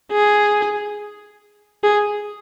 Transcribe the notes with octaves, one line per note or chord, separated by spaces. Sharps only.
G#4
G#4